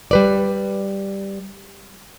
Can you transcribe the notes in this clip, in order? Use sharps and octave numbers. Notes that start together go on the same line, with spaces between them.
G3 B4 D5